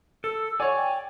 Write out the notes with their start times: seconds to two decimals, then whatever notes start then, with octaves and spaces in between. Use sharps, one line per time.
0.24 A4 E6
0.60 C#5 D5 F#5 G#5
0.76 G5